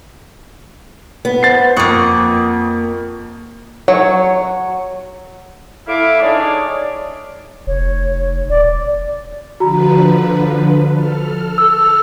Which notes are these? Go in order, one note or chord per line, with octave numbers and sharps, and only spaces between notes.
B3
C5 A6 C7
F2 A#3 F#5 C#6 D#6
F#3 C#5
A2 E4 F5 D6
D4 D#4 G#4 C#5 D5
F1 C#5
D#1 D5
D3 F3 F#4 B4 A#5
A4 F6
E6